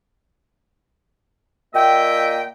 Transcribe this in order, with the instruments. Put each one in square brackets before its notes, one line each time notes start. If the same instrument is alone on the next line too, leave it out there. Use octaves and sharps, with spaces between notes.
[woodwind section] A#2 A#3 D#5 E5 G5